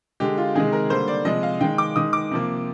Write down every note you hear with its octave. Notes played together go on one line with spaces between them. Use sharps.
D3 G#3 G4
F4
C3 D#3 G#3 G#4
A#4
D3 G3 A#3 C5
D5
C3 F3 G#3 D#5
F5
D#3 G#3 G5
D6
D#3 G#3 D#6
D6
C3 F3 A#3